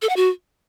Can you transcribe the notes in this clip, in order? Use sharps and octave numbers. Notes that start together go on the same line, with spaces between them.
A4
F#5
F#4